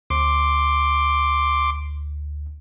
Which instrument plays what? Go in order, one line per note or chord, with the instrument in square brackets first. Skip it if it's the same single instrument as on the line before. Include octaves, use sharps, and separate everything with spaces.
[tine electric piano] D2 [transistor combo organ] C6 D6